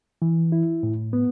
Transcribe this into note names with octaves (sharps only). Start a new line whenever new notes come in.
E3
E4
A2
B3